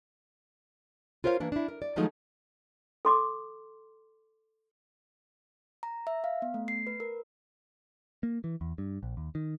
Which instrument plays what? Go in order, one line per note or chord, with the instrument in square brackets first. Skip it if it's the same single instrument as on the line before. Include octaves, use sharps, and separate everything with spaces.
[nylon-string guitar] F4 A#4 C5 C#5 F5
E3 A#3 D4
D4 E4
A#4
D5
D#3 F3 F#3 G#3 A3 D#4
[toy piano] A4 C6 D6
[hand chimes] A#5
E5
F5
B3
A3
C7
B4
A#4
[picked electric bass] A#3
E3
E2
G2
A#1
D#2
D#3